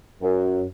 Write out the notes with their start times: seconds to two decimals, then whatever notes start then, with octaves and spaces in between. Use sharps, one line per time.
0.22 F#2